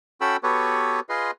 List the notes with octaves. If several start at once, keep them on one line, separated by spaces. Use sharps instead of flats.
C#4 F#4 A4 G5 B5 E6
B3 F#4 G4 A4 B4 C#5
F4 G#4 B4 D#5 C6